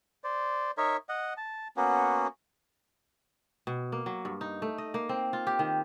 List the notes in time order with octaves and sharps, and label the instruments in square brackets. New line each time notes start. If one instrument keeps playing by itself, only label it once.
[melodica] C5 D5
D#4 A#4 C#5 E5
D#5 F#5
A5
A#3 B3 C#4 F#4
[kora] B2
A#3
F#3
G2
D#4
A3
D#5
A#3
C4
F4
G4
D#3